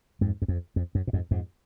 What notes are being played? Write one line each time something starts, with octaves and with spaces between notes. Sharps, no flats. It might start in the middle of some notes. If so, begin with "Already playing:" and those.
F2 G#2
F#2
F2
F2
F#2
A#2
F2 G#2
F2 G#2